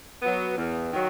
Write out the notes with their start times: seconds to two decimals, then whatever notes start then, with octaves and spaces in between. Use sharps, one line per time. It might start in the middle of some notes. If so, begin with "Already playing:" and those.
0.22 F#3 B3
0.57 E2
0.92 D#3 F#3